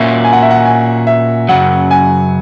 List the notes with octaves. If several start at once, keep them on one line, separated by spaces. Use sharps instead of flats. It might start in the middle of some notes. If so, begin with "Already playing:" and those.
Already playing: A#2 A#3 C#4 F#4 E5
G#5
F#5
E5
F#5
G#5
E5
F#2 C#3 F#3 F#5
G#5